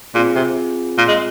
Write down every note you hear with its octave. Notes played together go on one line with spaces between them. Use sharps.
A#2 C4 F4 G#4
C3
A#2
G#3